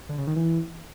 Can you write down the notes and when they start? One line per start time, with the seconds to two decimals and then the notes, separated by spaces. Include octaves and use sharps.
0.09 D3
0.18 C#3
0.27 D#3
0.36 E3